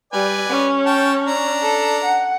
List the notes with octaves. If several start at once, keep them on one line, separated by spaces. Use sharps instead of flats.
G3 B4 D5 G#5
C#4
G5 A5
D4 A#5
A4
F#5